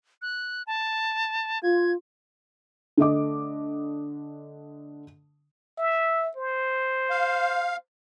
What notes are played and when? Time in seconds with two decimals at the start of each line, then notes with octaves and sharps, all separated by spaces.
0.22 F#6
0.67 A5
1.63 F4 G#6
2.97 D3 A3 D#5 D6
5.78 E5
6.37 C5
7.10 F5